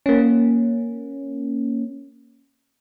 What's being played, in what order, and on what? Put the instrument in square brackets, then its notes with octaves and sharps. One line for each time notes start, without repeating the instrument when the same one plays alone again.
[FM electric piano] A#3 C#4